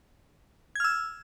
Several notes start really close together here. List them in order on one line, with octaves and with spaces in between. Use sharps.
G#6 F6 E6